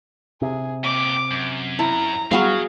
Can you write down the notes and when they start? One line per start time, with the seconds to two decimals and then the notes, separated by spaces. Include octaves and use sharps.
0.42 C3 G#4
0.84 A#2 G4 D6
1.31 F#2
1.79 E4 A#5
2.31 F#3 G3 B3 F#4 G#4 F5